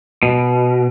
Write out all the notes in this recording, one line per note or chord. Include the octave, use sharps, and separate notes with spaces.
B2